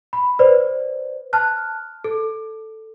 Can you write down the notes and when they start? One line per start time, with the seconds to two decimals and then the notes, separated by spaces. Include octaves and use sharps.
0.13 B5
0.39 B4 C5 D5
1.33 A5 F6 F#6
2.04 A4